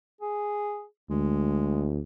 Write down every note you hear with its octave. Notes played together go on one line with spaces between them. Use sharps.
G#4
D2 G#3